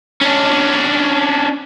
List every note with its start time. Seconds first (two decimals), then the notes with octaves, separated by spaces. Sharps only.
0.21 C#4 D4